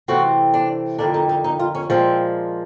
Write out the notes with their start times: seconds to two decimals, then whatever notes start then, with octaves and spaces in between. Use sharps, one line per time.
0.08 C3 E3 A3 C4 F#4
0.54 D4
0.98 F2 D3 G3 A#3 D4
1.14 D#4
1.29 D#4
1.44 D#4
1.59 F4
1.75 C#4
1.90 A#2 F3 G#3 C4